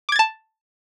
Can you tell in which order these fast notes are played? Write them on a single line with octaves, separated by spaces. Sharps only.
D6 G#6 A6 A5